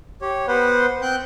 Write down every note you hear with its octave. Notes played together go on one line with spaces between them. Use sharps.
G4 C#5
B3 B4 C5 F#5
C4 G5 F#6 G6